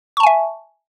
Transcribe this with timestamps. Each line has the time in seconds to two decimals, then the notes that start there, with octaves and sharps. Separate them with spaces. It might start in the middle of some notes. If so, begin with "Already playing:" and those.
0.17 C#6
0.20 A5
0.23 G#5
0.27 E5